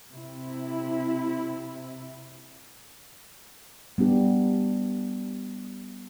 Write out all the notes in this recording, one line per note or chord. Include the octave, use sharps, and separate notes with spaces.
C3 E4
G3 B3 D4 G4